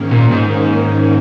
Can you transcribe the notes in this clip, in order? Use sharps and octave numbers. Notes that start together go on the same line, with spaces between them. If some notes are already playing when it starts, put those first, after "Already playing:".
Already playing: G#2 D#3 A#3 C#4
A#2
G#2